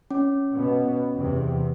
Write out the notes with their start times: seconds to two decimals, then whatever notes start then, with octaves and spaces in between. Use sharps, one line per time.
0.11 C#4
0.53 B2 B3
1.15 E2 C3